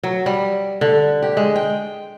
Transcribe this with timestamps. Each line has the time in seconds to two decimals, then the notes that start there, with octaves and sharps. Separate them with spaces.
0.03 F#3
0.26 G3
0.81 D3
1.22 G4
1.37 G#3
1.56 G5